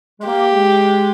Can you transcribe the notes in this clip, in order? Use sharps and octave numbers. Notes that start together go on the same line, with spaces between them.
G#3
A#3 G4
G#3